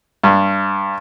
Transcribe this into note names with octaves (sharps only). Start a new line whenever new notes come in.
G2